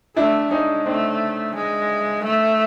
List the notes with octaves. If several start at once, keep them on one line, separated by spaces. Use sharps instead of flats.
A3 D4 E4
G#3 C#4 D#4
A3 C4 D4
G#3
A3